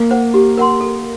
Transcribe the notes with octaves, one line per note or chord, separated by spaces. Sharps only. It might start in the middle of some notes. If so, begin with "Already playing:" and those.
Already playing: A#3
C5 F#5
G4
A#4 F#5 C6
A4